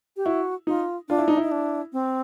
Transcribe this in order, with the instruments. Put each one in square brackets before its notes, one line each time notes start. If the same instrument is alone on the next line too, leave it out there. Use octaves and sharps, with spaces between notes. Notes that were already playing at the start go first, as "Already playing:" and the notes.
[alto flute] G4
[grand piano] E4 [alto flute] F#4
[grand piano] D#4 [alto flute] F4
[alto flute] D4 [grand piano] F4
[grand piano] E4
D#4
E4
[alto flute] D#4
D4
C4